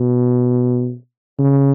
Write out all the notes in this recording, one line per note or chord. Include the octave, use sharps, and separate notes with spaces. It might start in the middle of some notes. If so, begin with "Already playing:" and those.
Already playing: B2
C#3